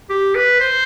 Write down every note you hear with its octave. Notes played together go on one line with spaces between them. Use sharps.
G4
B4
C5